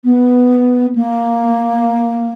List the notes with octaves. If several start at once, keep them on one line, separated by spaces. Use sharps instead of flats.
B3
A#3